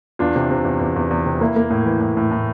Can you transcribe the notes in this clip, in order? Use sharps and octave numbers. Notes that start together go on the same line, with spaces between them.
E2 D4 F4
C3
C3
E2
E2
E2
E2
C3
A#3 E4
A#3
A2
E3
A2
A2
A2